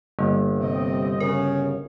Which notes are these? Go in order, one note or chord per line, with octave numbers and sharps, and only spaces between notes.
G1 A#3
C3 C4 D#5
C#3 F#4 A#4 C#5